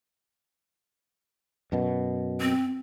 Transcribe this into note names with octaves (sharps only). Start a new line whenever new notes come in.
F#2 B2
C4